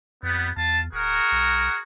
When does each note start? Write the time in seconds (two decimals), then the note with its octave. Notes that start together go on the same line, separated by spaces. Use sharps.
0.23 F2 G3 B3
0.57 E2 F4 A5
0.93 D1 F#4 G#4 A#4
1.32 B1